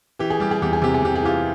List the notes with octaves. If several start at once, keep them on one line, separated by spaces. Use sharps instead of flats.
E3 G4
G#4
G3 G4
G#4
E2 G4
G#4
C3 G4
G#4
C3 G4
G#4
E3 F4 G4